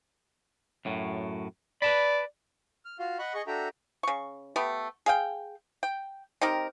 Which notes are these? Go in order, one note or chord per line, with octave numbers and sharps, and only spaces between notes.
F#2 A2 F#3
B4 D5 A5 B5
F6
F4 F#4 F5
D#5 F#5 B5 C#6
G#4 D#5 C#6
D4 F#4 A4 E5 G5 A#5
C#3 C#6
A3 B3 G4
G#4 F5 G5
G5
C4 D#4 G4 A#4